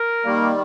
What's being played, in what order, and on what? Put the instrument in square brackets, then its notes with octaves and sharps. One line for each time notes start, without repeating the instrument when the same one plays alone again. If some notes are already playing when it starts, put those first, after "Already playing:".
Already playing: [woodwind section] A#4
[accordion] D#3 G3 [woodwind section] A#3